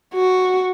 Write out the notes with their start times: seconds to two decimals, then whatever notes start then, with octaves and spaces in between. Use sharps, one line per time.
0.14 F#4